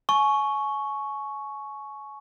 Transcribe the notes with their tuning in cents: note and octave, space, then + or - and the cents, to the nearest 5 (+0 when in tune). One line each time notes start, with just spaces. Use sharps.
G#5 +35 C#6 +0